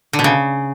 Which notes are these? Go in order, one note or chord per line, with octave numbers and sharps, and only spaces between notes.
D3
B2
C#3